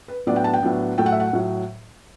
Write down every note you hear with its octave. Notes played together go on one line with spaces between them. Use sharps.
B4
A2 F#3 B3 D4 D5
G5
A5
G5
A2 F#3 B3 D4
A2 F#3 A3 G5
F#5
E5
F#5
A2 F#3